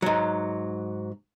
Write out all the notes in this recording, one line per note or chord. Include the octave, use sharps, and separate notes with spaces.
G#2 F#3